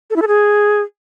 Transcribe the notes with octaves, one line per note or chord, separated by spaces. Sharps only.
A4
E4
A4
G#4